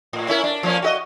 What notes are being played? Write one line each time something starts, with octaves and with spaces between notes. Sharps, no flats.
A2
C#4 E4 A#4
D4
F3 A#3 C#4
F#4 G4 D#5